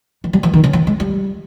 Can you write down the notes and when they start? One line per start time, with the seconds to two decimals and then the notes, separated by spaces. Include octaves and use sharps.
0.24 E3
0.33 G3
0.43 E3
0.54 D#3
0.64 C#3
0.73 E3
0.87 G#3
1.00 G3